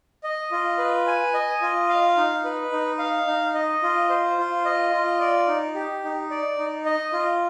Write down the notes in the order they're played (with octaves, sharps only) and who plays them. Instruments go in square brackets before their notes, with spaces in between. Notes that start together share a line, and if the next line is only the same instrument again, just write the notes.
[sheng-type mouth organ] D#5
F4
B4
G#5
D#5
F4
F5
D#4
B4
D#4
F5
D#4
D#5
F4
C5
F4
D#5
F4
D5
D#4
G4
D#4
D5
D#4
D#5
F4